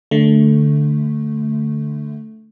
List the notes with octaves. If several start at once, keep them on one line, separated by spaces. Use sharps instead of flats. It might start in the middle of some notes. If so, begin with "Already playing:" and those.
D3 A3